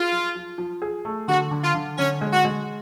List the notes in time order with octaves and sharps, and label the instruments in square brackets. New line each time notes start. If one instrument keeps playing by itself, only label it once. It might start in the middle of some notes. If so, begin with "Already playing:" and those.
Already playing: [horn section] F4 [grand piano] G#4
[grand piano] F3
F3
F3
G#4
A3
[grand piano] D3 [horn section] F#4
[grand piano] D3
[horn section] F4
[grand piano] D3
[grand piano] D3 [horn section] C#4
[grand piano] G#3
[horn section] F#4
[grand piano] G#3